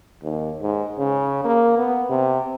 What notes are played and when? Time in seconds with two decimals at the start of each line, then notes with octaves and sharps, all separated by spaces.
0.23 D#2
0.61 G#2
0.98 C#3
1.44 A#3
1.78 B3
2.10 C3